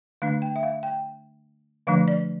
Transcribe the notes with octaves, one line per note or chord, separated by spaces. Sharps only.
D3 A3 D4 F5
G5
E5
F5
G5
D3 F3 A3 D4 F5
D5